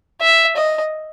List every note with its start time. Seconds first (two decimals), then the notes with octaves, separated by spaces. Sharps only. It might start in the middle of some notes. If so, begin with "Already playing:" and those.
0.21 E5
0.56 D#5